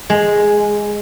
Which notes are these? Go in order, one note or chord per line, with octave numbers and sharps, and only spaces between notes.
G#3